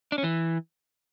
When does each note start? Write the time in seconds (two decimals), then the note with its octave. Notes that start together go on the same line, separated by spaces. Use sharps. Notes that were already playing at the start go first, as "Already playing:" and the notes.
0.12 D4
0.18 C#4
0.24 E3